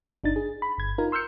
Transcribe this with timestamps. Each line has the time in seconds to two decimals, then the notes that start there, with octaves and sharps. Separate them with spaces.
0.24 G1 D4 D#4 A6
0.36 G#4
0.62 B5
0.78 G1 G#6
0.98 D#4 F4 A#4
1.12 C6 E6 F6 G6 C#7